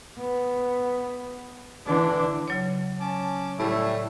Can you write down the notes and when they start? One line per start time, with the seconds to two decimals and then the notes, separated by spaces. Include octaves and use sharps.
0.18 B3
1.86 D3 E3 D4
2.48 C#3 F#3 C#5
3.00 C#4 A5 D6
3.59 A2 G3 A3 E5